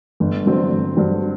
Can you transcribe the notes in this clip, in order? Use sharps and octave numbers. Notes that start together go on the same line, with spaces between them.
G1
G2 D3 F#3 C4
G1
G2 D3 F#3 C4